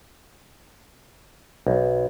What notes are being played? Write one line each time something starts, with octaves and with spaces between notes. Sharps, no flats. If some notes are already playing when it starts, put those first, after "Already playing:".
B1